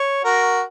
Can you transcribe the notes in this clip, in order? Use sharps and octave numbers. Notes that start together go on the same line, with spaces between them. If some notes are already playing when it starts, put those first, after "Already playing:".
Already playing: C#5
F#4 A#4